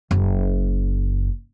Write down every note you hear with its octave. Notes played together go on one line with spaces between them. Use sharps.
F#1